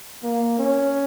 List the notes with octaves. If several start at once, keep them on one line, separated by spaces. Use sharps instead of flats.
A#3
C#4